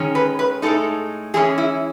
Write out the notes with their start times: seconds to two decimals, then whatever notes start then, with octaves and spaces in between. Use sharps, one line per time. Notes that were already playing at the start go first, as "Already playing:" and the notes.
Already playing: D#3 G#3 C#4
0.15 B4
0.39 B4
0.62 A2 G#3 D#4 A4
1.34 E3 G#3 C#4 G#4
1.58 E4